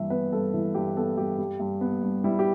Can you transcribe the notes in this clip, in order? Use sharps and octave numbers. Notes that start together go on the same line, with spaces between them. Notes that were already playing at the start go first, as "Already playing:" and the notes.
Already playing: G2 E3 E5
B3 B4
G2 A4
E3 E4
G2 G4
B3 A4
G2 G4
G3
G2
B3
G2
G3 E4
G4